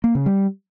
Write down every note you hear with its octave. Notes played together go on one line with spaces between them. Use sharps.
A#3
C#3
G3